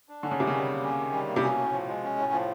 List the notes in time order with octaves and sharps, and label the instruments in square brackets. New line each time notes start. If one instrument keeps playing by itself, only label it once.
[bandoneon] D4
[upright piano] D3 [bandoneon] C#4
[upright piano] C#3
[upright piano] C3 [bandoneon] D#3
[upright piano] C#3
[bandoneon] G3
A#3
C#4
D#3
G3
A#3
[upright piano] C3
[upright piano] B2 [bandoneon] C#4
[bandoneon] A2
F3
G#3
C#4
A2
F3